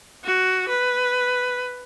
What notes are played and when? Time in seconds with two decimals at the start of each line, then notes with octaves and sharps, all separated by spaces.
0.24 F#4
0.68 B4